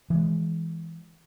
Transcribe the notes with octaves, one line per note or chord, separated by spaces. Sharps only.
E3 G#3